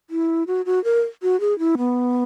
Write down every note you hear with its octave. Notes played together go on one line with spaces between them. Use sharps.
E4
F#4
F#4
A#4
F#4
G#4
E4
B3